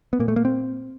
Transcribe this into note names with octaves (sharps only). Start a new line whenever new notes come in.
B3
A#2 A#3
A3
A#3
C4